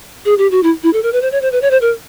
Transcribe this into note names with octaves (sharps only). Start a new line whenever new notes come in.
G#4
G4
F#4
E4
E4
A4
A#4
B4
C5
C#5
C5
B4
C#5
C5
A#4